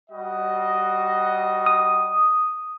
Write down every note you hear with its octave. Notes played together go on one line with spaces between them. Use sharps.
G3 F#4 D#5
D#6